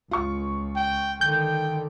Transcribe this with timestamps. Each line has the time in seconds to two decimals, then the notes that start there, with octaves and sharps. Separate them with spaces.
0.11 C#2 F4 C#6
0.76 G5
1.21 D3 D#3 G5 G6